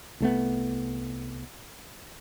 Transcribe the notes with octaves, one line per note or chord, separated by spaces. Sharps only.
C2 A3 B3